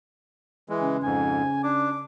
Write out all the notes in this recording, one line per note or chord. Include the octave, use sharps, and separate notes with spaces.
E3 G#3
C#3
F2 G#2 G#5
D4 D6